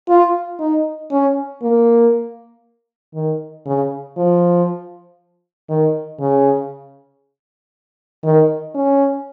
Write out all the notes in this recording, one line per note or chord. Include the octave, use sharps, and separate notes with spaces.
F4
D#4
C#4
A#3
D#3
C#3
F3
D#3
C#3
D#3
C#4